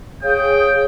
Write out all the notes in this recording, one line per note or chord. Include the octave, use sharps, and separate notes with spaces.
G#4 C#5 F5 G5 D#6